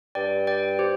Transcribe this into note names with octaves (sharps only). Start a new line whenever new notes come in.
G2 D5 G5
D5 G5
G4 C5